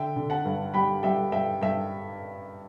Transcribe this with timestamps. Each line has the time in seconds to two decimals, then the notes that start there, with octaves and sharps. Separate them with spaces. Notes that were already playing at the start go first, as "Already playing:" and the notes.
Already playing: D3 E5 G5
0.16 D3
0.30 F#5 A5
0.45 G2
0.74 G3 G5 B5
1.03 G3 E5 G5
1.32 G2 E5 G5
1.61 G2 E5 G5